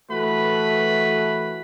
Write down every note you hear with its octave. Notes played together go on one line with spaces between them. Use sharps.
E3 A3 F#4 A4 B4 B5